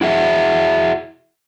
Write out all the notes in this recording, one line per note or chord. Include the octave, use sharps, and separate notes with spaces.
E4 F#4 G#4 E5